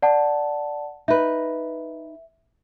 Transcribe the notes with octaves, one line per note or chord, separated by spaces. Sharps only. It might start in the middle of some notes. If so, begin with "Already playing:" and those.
D5 F#5 A5
D#4 B4 E5